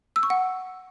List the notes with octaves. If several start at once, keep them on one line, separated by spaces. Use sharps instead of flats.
E6
C#6
F#5